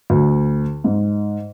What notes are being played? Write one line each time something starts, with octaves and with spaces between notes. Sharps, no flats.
D2
G#2